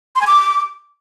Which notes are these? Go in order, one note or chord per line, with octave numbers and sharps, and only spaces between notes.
C6
G#5
D6